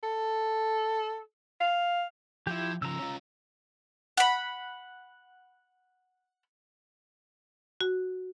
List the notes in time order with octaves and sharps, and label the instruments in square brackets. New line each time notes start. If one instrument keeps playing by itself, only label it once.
[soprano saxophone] A4
F5
[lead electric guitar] F3 [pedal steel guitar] E4 G4
[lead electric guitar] C#3 F3 [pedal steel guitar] A#5 E6
[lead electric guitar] C#4 F4
[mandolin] F#5 B5
[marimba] F#4